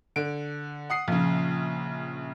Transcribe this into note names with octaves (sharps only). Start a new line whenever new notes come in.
D3 D7
F#5 D#6 C7
A#1 C#3 F3